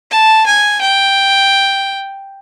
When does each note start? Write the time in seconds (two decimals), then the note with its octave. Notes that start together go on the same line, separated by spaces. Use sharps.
0.11 A5
0.46 G#5
0.81 G5